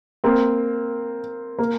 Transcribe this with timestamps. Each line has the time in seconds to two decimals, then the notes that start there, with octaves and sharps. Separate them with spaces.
0.24 A#3 C4
1.59 A#3